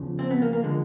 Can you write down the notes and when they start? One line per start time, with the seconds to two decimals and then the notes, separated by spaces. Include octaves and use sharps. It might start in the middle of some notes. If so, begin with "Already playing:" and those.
Already playing: E2 C#3 F3
0.19 C4
0.31 B3
0.42 A#3
0.53 A#3
0.63 D3 F3 G#3